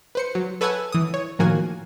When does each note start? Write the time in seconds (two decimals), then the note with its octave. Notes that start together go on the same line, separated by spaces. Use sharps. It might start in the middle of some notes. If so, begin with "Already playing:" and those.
0.15 B4 C5 C#7
0.35 F#3
0.61 A4 B4 C#5 E5 F#5 G#5
0.92 E3 D#6
1.14 C#5
1.39 A2 D#3 F3 A#3 F#4 G#5